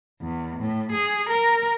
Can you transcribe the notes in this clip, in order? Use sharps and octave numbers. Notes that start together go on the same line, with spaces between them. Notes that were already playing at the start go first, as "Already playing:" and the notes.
E2
A2
G#4
A#4